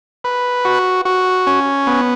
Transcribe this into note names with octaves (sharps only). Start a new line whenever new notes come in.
B4
F#4
F#4
C#4
B3